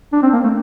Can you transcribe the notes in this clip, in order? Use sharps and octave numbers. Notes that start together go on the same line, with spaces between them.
D4
C4
A#3
A3